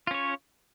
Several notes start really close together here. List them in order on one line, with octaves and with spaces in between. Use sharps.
F4 C#4 C#5